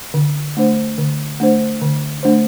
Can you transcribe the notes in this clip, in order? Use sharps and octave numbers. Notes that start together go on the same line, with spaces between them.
D3
A3 D4 C5
D3
A3 D4 C5
D3
A3 D4 C5